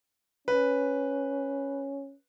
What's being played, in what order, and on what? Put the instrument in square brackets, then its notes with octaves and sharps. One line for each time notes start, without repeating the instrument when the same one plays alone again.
[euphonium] C#4 [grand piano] B4